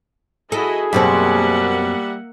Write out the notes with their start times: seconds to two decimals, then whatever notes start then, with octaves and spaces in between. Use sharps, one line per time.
0.52 E4 F#4 G#4 A4 D#5
0.93 F#2 B2 G3 A#3 C4 E5 F#5